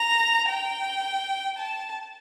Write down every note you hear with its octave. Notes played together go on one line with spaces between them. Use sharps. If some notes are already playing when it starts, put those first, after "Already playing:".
Already playing: A#5
G5
A5